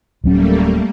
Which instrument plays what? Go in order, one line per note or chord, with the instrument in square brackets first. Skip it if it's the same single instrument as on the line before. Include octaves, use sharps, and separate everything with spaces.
[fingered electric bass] D1 F#3 C#4 [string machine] G3 A3 A#3